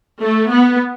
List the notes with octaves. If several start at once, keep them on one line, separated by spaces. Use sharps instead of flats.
A3
B3